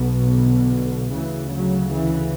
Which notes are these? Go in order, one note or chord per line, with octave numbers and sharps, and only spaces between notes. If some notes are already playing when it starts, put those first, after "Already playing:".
Already playing: B1 B2
D3
D2 C#3 E3
F#3
E3